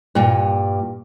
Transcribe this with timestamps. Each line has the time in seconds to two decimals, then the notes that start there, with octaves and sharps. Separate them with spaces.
0.15 G2 A#2